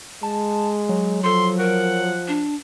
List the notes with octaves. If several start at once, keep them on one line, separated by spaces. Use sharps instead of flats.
G#3 A5
F#3
F3 A4 C6
A#4 F#5
D4